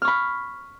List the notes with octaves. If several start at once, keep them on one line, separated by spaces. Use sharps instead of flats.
B5 C#6 F6